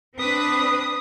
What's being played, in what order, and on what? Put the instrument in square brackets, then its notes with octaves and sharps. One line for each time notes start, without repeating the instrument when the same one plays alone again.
[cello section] C4 D4 B4 [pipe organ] D#6